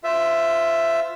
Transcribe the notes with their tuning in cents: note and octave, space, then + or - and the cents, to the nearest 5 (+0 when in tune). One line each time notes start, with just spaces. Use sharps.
F4 +0 C5 -30 E5 +10